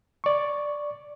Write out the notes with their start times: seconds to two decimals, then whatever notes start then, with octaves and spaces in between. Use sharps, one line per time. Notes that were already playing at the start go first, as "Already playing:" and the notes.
0.24 D5 C#6